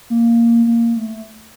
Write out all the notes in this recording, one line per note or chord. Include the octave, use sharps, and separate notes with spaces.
A#3
A#3
A3